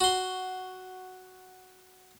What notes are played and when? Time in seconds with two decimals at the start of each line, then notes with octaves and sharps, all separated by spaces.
0.01 F#4 C6